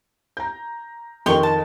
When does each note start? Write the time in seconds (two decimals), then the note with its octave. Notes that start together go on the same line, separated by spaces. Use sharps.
0.37 A#5 G6
1.26 F2 D#3 G4 C6 C#6
1.43 A5